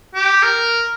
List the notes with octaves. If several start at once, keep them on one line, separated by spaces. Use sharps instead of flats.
G4
A#4